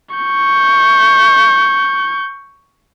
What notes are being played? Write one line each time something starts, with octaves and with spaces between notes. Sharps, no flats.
C#6 G6